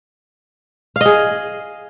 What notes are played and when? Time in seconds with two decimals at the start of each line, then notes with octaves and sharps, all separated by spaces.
0.96 F5
1.01 D#5
1.06 G#4